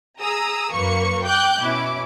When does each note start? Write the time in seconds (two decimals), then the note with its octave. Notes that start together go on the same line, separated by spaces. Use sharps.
0.20 G#4 A#5 D#6 E6
0.73 F#2 F#3 A#3 B4 C#6 C#7
1.25 G5 D6 F#6 G6
1.61 B2 C#4 E4 D6